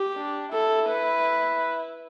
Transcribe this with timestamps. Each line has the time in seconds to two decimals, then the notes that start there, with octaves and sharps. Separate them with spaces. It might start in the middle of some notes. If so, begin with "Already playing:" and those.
Already playing: G4
0.17 D4
0.52 E4 A4
0.89 B4